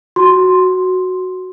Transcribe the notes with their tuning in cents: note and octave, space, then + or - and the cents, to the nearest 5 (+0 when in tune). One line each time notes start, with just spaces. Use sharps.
F#4 +0 C6 +0